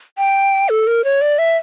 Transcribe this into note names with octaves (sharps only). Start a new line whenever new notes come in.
G5
A4
A#4
C#5
D5
E5